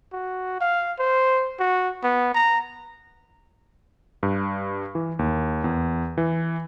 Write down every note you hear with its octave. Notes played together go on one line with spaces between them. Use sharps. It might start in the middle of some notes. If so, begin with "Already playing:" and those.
F#4
F5
C5
F#4
B3
A#5
G2
E3
D#2
E2
E3